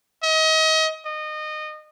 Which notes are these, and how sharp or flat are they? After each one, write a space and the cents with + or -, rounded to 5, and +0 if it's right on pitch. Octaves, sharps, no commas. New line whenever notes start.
D#5 +30
D#5 -25